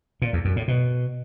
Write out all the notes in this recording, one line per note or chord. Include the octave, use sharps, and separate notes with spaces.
A#2
E2
F#2
A2
B2